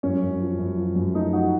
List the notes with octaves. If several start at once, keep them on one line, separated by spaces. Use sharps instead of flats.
F#2 C#4
F#2
F3
F#2
F3
F#2
A3 D#4
F3 D#4 F#4